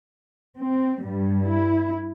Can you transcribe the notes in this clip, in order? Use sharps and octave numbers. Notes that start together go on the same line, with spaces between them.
C4
G2 G3
E4